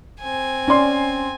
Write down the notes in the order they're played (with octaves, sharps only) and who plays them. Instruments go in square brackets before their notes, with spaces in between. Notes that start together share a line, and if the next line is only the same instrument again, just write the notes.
[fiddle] C4 G#5
[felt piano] C#4 D5 C6